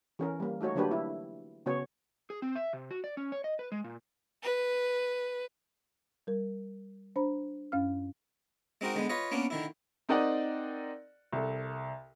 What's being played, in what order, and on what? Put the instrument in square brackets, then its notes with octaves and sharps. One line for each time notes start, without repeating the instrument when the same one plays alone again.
[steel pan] E3 C#4 A#4
G3 A#3
A3 D#4 F#4 C#5
D3 F#3 A#3 D4 G4 B4
E4
C#3 B3 F#4 C#5
[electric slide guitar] G#4
C4
E5
C3
F#4
D5
C#4
C#5
D#5
B4
G#3
A#2
[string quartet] B4
[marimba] G3 A#4
D4 C5 A#5 B5
F#2 C#4 F5 F6
[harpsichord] G#3 C4 D#4 F#4 A#4
D3 G#3 B3
F4 B4 C#5 D#5
A#3 B3 C#4 D4
D3 D#3 E4
[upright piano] C4 D#4 A#4 D5 D#5 F#5
C2 A4